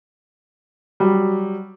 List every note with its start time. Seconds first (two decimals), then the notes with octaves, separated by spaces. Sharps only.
1.00 F#3 G3